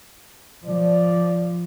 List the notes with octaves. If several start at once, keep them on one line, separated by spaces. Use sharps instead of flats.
F3 D5